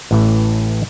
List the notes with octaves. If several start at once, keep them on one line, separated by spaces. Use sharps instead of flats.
A1 A2 E3 A3